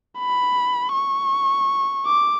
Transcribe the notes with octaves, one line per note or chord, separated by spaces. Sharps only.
B5
C#6
D6